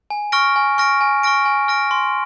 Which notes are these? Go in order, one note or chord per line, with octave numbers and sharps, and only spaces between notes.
G#5
C#6 F6 A#6 D7
G#5
C#6 F6 A#6 D7
G#5
C#6 F6 A#6 D7
G#5
C#6 F6 A#6 D7
C6